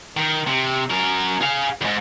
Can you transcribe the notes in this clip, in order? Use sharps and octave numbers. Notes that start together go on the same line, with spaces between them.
D#3
C3
F#2 A#4
G#4 F5
E2 G#2